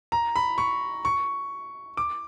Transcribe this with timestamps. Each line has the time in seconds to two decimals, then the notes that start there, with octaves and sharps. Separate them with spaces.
0.12 A#5
0.36 B5
0.58 C#6
1.05 C#6
1.97 D6